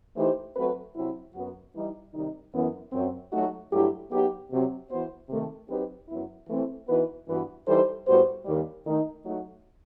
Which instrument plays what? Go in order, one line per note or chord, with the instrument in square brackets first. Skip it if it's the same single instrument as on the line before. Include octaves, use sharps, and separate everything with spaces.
[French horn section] E3 A3 D#4 G4 C5
F#3 A3 C4 F#4 B4
C3 F#3 C4 E4
F#2 F#3 B3 F#4
E3 G3 D#4
C3 D#3 G3 D#4
F#2 E3 B3
F#2 F#3 C4
F#3 A3 D#4 F#4
G2 F#3 A3 E4 G4
F#3 B3 D#4 G4
C3 F#3 C4
E3 B3 F#4 C5
C3 D#3 A3
F#3 C4 D#4 G4 B4
F#2 F#3 B3 E4
E3 A3 C4
E3 B3 D#4 F#4 B4
G2 E3 B3 F#4 B4
E3 G3 D#4 A4 C5
A2 G3 B3 F#4 C5
D#2 D#3 G3
D#3 A3 D#4
F#3 A3 D#4 F#4